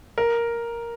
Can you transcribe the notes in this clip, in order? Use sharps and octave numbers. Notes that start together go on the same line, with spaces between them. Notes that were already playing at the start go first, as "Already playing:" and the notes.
A#4